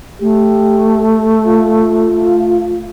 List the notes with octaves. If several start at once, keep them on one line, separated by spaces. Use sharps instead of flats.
A3 G4
F4